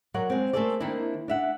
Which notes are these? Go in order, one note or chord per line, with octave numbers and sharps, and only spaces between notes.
F#3 A#4 C#5 D5 F#5
G#3 C4
A3 A#3 G#4 A4 C5 D5
D#3 A#3 C4 D4 E4
D4 E5 F#5